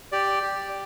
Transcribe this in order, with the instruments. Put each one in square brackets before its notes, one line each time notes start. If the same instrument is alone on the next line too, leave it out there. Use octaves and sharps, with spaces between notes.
[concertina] G4 D5
G4